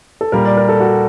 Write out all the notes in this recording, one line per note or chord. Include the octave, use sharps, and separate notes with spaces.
A4
A#2 G3 A#4
D5
A#4
A4
F#4